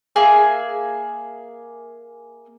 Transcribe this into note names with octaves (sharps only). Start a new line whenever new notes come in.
A#3 G#4 E5 G#5